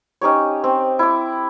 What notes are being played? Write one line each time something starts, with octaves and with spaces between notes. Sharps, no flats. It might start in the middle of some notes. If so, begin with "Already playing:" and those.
C#4 D#4 G4 C#5
C4
E4 D6